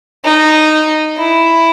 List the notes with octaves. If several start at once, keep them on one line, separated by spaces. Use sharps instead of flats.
D#4
E4